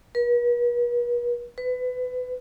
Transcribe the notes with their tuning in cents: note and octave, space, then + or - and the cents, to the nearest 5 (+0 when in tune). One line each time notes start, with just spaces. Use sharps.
B4 -45
B4 +25